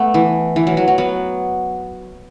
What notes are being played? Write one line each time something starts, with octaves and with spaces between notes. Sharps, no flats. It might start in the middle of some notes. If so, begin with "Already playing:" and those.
Already playing: A3 B3
E3
E3
F#3
F#3
F#3
F#3 B3